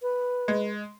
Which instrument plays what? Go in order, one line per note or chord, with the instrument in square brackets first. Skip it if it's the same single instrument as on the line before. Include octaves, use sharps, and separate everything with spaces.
[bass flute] B4
[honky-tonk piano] G#3